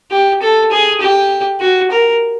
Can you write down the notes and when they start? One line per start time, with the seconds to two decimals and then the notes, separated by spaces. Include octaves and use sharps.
0.11 G4
0.42 A4
0.72 G#4
1.01 G4
1.60 F#4
1.91 A#4